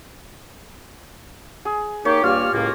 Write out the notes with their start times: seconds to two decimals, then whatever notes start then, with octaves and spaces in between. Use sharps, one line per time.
1.65 G#4
2.05 A#3 D#4 G4 C#5
2.23 G2 A#3 F4 G4 F6
2.53 C#2 A2 A#3